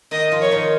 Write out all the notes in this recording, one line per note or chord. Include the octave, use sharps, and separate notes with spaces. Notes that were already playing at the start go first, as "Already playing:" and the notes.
D#3 D#4 D#5
F3 F4
C#5
D#3 D#4